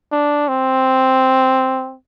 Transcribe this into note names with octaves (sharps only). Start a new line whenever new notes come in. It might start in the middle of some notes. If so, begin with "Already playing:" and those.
D4
C4